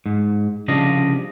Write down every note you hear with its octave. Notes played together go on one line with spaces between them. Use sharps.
G#2
C2 C#3 F3 D4 D#5 F5